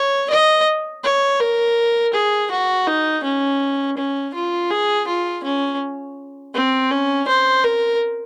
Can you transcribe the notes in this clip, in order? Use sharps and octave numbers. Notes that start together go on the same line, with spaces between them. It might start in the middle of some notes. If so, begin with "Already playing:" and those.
Already playing: C#5
D#5
C#5
A#4
G#4
F#4
D#4
C#4
C#4
F4
G#4
F4
C#4
C4
C#4
C5
A#4